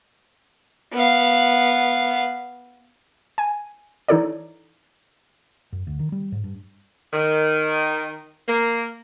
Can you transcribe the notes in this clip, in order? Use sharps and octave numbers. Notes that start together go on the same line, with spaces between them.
B3 F5
G#5
E3 D#4 E4 A4 C#5 D5
F#2
D2
D#3
G3
G#2
G2
D#3
A#3